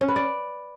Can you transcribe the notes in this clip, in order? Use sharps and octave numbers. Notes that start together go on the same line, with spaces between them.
C#4
B4
D5